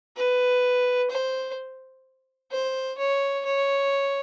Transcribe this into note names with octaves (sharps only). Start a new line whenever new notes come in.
B4
C5
C5
C#5
C#5